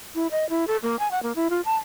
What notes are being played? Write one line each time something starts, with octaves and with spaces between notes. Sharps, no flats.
E4
D#5
E4
A4
A#3
G#5
F#5
A#3
E4
F4
A5